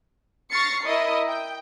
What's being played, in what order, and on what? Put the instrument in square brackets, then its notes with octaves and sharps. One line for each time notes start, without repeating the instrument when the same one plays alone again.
[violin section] C#6 F6 A6 A#6 C7 C#7
E4 A#4 D#5 D#6
G5